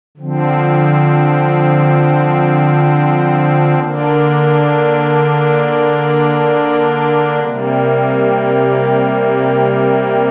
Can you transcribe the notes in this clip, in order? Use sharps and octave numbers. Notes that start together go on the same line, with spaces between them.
D3 F3 C4
D3 A#3 D4
C3 G3 A#3